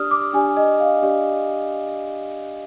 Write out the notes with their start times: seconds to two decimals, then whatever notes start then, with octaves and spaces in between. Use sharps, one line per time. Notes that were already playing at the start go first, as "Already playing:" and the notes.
Already playing: D4 G4 D5 D#6 F6
0.11 D6
0.33 D4 G4 D5 G#5
0.57 D#5
0.80 F5
1.02 D4 G4 D5